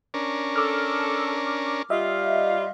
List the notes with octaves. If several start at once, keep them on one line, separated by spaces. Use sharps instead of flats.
C#4 D4 A#4
A4 D6 F6
G3 F4 D#5 E5